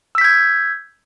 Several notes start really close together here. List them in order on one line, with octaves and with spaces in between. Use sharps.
E6 B6 G6 G#6